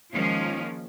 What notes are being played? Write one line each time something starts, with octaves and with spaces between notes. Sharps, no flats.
D#3 F3 G#3 A#3 C#4 F4